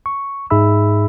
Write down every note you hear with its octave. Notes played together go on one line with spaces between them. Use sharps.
C#6
G#2 D#4 G#4 E5 B5 E6